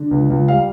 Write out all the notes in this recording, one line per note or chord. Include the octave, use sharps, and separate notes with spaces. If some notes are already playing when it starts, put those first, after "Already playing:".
Already playing: D3
C#2
C#2
G3 F5